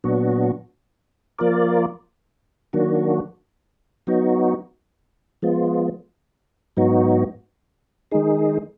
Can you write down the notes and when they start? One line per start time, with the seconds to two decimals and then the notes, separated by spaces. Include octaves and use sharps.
0.04 A#2 F#3 B3 D4 F#4
1.39 F3 A#3 F4 A#4 D5
2.73 D#3 F#3 A#3 D4 F#4
4.07 F#3 B3 D#4 F#4
5.42 F3 G#3 B3 F4
6.77 G#2 F#3 B3 D#4 F#4
8.11 D#3 G#3 D#4 G#4